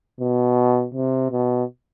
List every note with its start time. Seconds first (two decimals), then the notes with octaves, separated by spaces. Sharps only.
0.20 B2
0.94 C3
1.31 B2